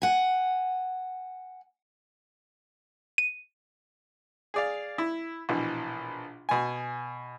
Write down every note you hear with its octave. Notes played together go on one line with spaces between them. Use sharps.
F#5 G#5
D#7
G#4 D5 F5
E4
A#1 B2 E3
B2 G#5